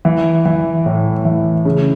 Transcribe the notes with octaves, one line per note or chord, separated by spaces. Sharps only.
E3
E3
A2
E3
C#3